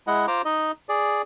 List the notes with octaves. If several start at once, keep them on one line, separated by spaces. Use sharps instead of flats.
G#3 E4 D#5 F#5
F4 C5 A#5 D6
D#4 D#5
G#4 D5